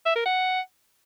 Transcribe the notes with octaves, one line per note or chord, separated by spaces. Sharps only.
E5
A#4
F#5